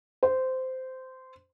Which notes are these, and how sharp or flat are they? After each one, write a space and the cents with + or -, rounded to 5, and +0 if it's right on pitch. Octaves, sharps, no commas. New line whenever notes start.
C5 -15